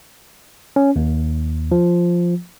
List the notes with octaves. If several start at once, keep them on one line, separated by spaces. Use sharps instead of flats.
C#4
D#2
F3